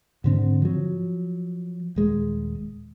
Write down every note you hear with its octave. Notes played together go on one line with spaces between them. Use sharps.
G#2 D3 C4
F3 F#3
D#1 G#3